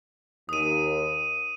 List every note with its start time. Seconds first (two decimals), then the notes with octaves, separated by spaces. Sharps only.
0.49 D#2 D#6 D#7